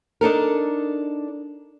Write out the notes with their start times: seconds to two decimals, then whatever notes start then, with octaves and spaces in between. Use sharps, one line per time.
0.21 D4 D#4 A4 A#4